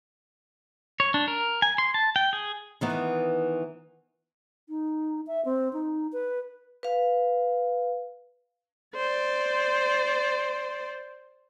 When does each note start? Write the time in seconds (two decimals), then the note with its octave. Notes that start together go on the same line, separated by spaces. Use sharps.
1.00 C#5
1.14 D4
1.28 A#4
1.62 G#5
1.78 C6
1.94 A5
2.16 G5
2.33 G#4
2.81 D#3 E3 B3
4.69 D#4
5.27 E5
5.45 C4
5.73 D#4
6.13 B4
6.83 B4 F5
8.96 C5 D5